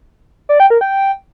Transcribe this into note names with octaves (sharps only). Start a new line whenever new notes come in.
D5
G5
A#4
G5